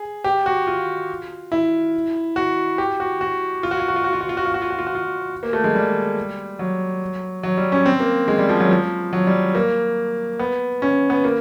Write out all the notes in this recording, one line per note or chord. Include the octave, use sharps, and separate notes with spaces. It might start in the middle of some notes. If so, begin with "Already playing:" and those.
Already playing: G#4
G4
F#4
F4
E4
F#4
G4
F#4
F#4
F4
F#4
F4
F#4
F4
F#4
F4
F#4
F4
F#4
F4
F#4
F4
F#4
F4
F#4
F4
A#3
A3
G#3
G3
F#3
F#3
G3
C#4
C4
A#3
G#3
G3
F3
F#3
F3
F#3
G3
A#3
B3
C#4
B3
A#3